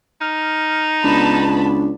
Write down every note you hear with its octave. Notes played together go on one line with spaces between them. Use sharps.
D#4 F6
C#2 B3 D4 A5 B5